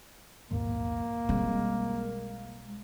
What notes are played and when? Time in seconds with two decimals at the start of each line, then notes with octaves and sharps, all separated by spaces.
0.51 A#1 D#2 G#2 A#3
1.29 B1 G3 G#3 C4